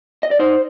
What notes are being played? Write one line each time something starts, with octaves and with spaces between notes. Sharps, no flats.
D#5
D5
D#4 C5